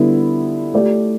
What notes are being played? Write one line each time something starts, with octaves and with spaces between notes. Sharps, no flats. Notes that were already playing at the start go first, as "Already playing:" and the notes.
Already playing: D3 G3 B3 E4
A3 G4 D5